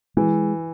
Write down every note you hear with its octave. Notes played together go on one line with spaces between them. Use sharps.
E3 G#3